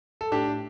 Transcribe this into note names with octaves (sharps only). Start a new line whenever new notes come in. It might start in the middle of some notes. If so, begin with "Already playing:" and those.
A4
A2 D4 G4